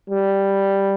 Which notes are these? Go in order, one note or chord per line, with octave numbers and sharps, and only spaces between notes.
G3